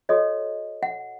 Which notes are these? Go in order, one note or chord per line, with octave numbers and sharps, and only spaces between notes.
F#4 A4 C#5 D#5
F#5